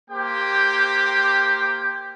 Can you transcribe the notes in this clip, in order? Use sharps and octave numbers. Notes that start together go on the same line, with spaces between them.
A#3 G4 C5 G5